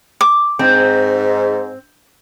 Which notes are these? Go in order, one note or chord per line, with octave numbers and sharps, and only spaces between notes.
D6
G#2 C4